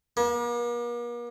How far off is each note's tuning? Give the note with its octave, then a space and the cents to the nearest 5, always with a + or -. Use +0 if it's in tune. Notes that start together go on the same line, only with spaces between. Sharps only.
A#3 +45